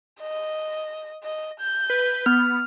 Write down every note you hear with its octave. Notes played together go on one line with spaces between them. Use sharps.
D#5
D#5
G6
B4
B3 F6